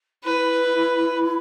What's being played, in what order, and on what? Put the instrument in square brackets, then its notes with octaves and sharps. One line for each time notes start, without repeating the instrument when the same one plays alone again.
[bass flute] E4 [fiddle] B4